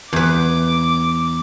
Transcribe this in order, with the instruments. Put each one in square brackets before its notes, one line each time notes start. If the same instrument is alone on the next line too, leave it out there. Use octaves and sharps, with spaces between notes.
[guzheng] E2 B4 [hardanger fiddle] D6